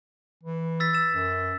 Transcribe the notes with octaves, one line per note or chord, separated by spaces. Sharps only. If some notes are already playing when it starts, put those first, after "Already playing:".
E3
E6 A6 B6
A6 E7
F#2